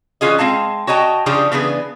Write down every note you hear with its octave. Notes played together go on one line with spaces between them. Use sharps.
E3 A3 C#4 F4 G#4 D#5
G#3 C4 F5 A5
F#4 C#5 D#5 G5 A5
C#3 F3 C#4 D4 G4 G#4
C#3 E3 B3 D4 G#4 B4